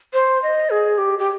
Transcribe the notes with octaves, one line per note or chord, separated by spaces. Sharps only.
C5
D#5
G#4
G4
G4